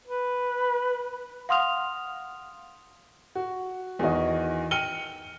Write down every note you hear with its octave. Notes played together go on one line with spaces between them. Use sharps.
B4
F5 F#5 C6 D#6 F6 F7
F#4
E2 D#3 E3 F#4 D#5
G5 F6 C#7 D#7 G7